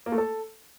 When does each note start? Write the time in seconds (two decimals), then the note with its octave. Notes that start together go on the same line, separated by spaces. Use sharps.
0.06 A#3
0.12 A3
0.18 A4